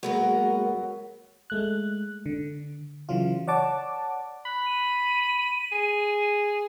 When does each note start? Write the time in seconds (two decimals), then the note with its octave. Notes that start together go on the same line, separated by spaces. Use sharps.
0.03 F#3 G#3 A#3 B3 F#4 A#4
1.50 G#3 A3 F#6
2.26 D3
3.09 C#3 E3 F#3 F4
3.47 C#5 D5 F#5 A5 D6
4.46 B5 F#6
4.66 D#7
5.72 G#4